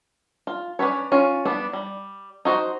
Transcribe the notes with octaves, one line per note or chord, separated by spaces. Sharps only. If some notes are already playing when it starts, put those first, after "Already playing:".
F4
C#4 D4 B4 C#5
C#4 F4
G3 B3 D4
G3
D#4 F#4 C5